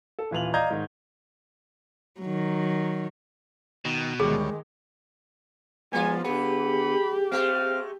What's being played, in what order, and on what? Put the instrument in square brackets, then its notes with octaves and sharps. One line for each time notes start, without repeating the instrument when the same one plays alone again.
[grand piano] A4
D#1 E3 F4 F7 F#7
D5 D#5 F5 A#5 G6 G#6
G#2 D#3
[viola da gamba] D#3 F#3
[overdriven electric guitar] B2 [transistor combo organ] D#3
[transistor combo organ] D2 G3 C#5 [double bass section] D#3 G#3 [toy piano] G#4
[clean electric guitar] F3 B3 [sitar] F#3 F4 [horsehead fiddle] G#3 [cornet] G#5
[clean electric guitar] D3 B3 [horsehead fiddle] G4 [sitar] G#4 [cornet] B5
[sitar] G#3 A3 [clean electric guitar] C4 [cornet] F5